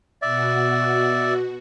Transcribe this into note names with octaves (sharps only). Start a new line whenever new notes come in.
B2 F#4 D5 E5